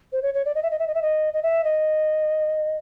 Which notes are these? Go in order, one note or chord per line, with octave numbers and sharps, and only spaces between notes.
C5
C#5
C#5
D5
D#5
E5
D#5
E5
D#5
E5
D#5
D#5
E5
D#5